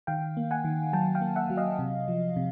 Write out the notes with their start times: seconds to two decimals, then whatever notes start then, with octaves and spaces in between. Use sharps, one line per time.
0.07 D#3 F5 G5
0.37 A#3
0.51 F#5 G#5
0.64 D#3
0.93 F#3 G5 A5
1.15 F5 G5
1.21 A#3
1.36 E5 F#5
1.50 F#3
1.57 D#5 F5
1.79 C3
2.08 F3
2.36 C3